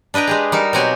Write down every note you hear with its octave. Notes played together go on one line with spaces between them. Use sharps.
D4 B4 D#5 G5 A#5
G#3 G4 G#4
G3 D#4 A#4
B2 F#3 C4 F#4 G4 G#5